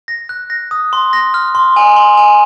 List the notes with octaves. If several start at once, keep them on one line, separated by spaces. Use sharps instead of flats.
A#6
F#6
A#6
D#6
C6
A#6
F6
C6
G#5
C6
G#5